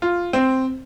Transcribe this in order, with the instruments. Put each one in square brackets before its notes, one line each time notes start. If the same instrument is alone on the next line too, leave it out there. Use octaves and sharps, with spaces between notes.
[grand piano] F4
C4